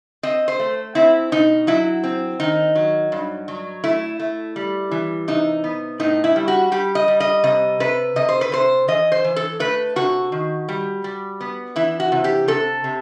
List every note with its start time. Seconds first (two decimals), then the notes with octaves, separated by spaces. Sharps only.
0.23 C4 D#5
0.48 C5
0.59 A3
0.95 C4 E4
1.32 B2 D#4
1.67 F#3 E4
2.04 C4
2.40 D#3 D#4
2.75 F#3
3.12 G2
3.48 F#3
3.84 A3 E4
4.20 A3
4.56 G3
4.91 E3
5.28 C3 D#4
5.64 B3
6.00 A2 D#4
6.24 E4
6.36 G3
6.48 F#4
6.72 G3 G4
6.95 D#5
7.08 G3
7.20 D#5
7.44 C3 D#5
7.80 C3 B4
8.16 C3 D#5
8.29 C5
8.41 B4
8.52 C3 C5
8.88 E3 D#5
9.12 C5
9.24 E3
9.36 A4
9.60 A3 B4
9.96 C3 F#4
10.32 D#3
10.69 G3
11.04 G3
11.41 B3
11.76 E3 E4
12.00 F#4
12.12 C3
12.24 G4
12.48 C3 A4
12.84 C3